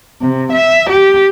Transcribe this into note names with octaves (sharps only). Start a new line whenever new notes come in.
C3
E5
G4